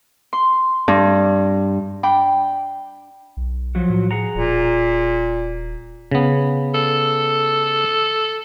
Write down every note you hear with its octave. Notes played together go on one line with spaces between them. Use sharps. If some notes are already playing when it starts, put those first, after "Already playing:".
C6
G2
D4 G5 B5
B1
F3 F#3 F#4
A2
G#4 F#5 A#5
D#1 A#2
C#3 B3
A4